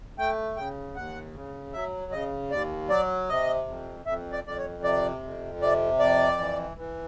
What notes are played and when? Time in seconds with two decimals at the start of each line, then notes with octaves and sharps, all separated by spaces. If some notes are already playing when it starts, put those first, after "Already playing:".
0.18 A3 G5
0.56 C#3 G5
0.95 D#2 F#5
1.34 C#3
1.73 F#3 E5
2.12 C#3 D#5
2.50 D#2 D5
2.89 F#3 D5
3.28 C3 D#5
3.67 F2
4.06 F2 E5
4.32 D5
4.45 F2 D5
4.58 C#5
4.83 C3 D5
5.23 F2
5.61 C3 D5
5.99 F2 D5
6.39 E3
6.77 E3